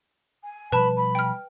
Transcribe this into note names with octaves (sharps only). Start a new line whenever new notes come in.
G#5
B2 F3 G3 B4 A5 B5
B5
G5 F6